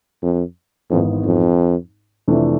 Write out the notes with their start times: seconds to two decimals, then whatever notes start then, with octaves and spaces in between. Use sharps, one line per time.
0.23 F2
0.90 G#1 F2 G#2 E3 B3
1.25 F2
2.28 F2 C3 E3 A3 D4